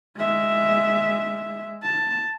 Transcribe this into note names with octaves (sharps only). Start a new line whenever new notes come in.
G#3 E5
A5